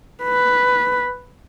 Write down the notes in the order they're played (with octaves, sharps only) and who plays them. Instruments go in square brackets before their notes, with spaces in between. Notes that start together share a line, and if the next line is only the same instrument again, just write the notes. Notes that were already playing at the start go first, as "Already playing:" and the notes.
[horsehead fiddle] B4